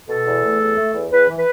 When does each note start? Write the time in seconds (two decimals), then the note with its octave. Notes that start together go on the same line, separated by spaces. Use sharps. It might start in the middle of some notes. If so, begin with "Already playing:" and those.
0.08 B2 A4
0.26 E2
0.43 A3
0.60 E2
0.77 A3
0.94 E2
1.11 E2 B4
1.29 E3
1.37 B4